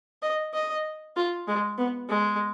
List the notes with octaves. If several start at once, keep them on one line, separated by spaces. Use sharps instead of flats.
D#5
D#5
F4
G#3
B3
G#3